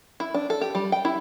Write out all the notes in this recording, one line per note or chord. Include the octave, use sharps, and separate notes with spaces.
E4
D4
A4
G4
G3
G5
E4